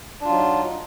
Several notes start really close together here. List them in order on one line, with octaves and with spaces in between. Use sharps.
D4 F4 F#3 D#4